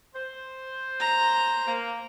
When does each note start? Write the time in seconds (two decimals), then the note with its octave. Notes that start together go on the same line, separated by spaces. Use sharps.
0.15 C5
1.00 A#5
1.68 A#3